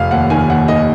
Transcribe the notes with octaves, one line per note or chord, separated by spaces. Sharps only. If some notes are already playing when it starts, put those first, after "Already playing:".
Already playing: F1 F5
D#2 F#5
D#3 G#5
D#2 F#5
D#3 D#5